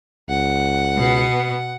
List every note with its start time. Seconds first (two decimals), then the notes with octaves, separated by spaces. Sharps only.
0.29 C#2 F#5
0.97 B2 B3